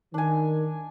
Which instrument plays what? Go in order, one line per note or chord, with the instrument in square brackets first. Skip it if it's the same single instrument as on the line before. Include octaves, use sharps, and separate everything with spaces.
[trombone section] D#3 [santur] D4 G#5